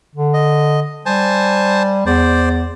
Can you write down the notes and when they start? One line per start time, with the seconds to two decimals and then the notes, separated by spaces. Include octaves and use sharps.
0.15 D3
0.34 D#5
1.06 G3 C5 G#5 A5
2.06 E2 C5 D5